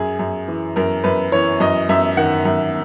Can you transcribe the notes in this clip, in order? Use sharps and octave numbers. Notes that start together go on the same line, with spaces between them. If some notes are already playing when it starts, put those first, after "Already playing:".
Already playing: F#2 G#4
F#2
E3
F#2 A#4
F#2 B4
E3 C#5
F#2 D#5
F#2 E5
D#3 F#5
F#2